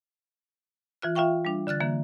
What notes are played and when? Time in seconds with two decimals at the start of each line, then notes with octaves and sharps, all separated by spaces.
1.02 E3 F4 F#6
1.15 F4 E5 F5 G5 C#6
1.45 G3 D4
1.67 D3 F6 F#6 A6
1.80 D3 E3 A#3